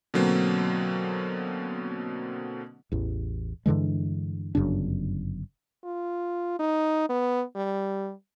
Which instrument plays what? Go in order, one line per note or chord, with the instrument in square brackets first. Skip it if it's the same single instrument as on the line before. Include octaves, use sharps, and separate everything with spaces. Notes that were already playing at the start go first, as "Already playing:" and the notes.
[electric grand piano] B2 D3 F#3 A#3 C4
[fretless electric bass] A1 E2
G2 D3 E3 G#3
G1 F#2 C#3 D4
[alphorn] F4
D#4
B3
G3